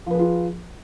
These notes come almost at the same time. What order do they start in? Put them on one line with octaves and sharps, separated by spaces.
F3 B4 G#4 F4